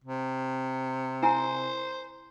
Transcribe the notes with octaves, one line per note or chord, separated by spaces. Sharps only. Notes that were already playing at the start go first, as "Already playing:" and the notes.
C3
E4 C5 G#5 A#5